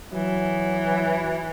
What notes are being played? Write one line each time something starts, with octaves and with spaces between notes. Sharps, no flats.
E3 F#3